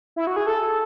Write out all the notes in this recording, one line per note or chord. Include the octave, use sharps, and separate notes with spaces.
E4
F#4
G#4
A4